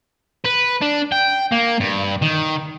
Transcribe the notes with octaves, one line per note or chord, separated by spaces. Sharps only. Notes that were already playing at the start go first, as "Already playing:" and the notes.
B4
D4
G5
A#3
G2
D#3